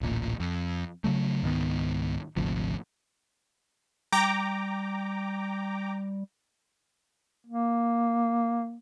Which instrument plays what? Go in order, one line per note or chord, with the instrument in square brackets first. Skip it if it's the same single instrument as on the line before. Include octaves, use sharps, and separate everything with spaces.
[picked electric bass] D1 A1 A#2
F2
C#3 F3 F#3 A3
C#2 G#2 D#3 B3
G#1 D2 C3 F3
[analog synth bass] G3 [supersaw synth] G5 A#5 D6
[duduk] A#3